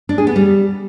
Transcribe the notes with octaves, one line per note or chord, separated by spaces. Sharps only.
D4
G#4
B3
G3